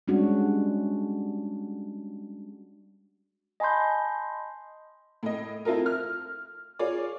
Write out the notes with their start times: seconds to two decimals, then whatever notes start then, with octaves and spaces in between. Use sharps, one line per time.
0.08 G3 G#3 C#4 D4 F#4
3.60 D#5 G#5 A5 B5 C6 G6
5.23 A2 D#5
5.65 C4 E4 F4 A4 A#4
5.86 F6
6.79 F4 G#4 C#5 D5